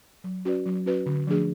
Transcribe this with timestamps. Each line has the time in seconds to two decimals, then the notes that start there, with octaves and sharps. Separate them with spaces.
0.24 F#3
0.45 C#4 F#4 B4 D5
0.66 F#3
0.86 C#4 F#4 B4 D5
1.06 D3
1.27 F3 A3 D4 G#4